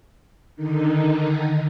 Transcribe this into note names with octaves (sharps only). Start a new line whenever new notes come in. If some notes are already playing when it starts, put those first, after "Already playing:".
D3 D#3 D#4